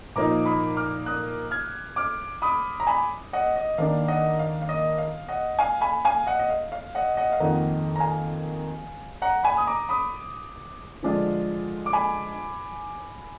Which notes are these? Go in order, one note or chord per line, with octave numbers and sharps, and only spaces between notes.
A#2 F3 A#3 D#4 A#5 D6
B5 D#6
D6 F6
D#6 F#6
F6 G#6
D6 F6
B5 D#6
A#5
G#5 B5
D#5 F#5
D#5
D#3 A#3 D4 F5
D#5 F#5
F5
F5
D#5
F5
D#5 F#5
F5 G#5
G#5 B5
F5 G#5
D#5 F#5
D#5
F5
F5
D#5 F#5
D#5 F#5
F5
F2 D#3 A#3 D#4 D#5 F#5
A#5
F5 G#5
F#5 A#5
G#5 B5
D#6
A#5 D6
B5 D#6
D3 F3 G#3 D4 F4
D6
G#5 B5